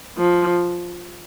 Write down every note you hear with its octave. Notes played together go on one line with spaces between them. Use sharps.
F3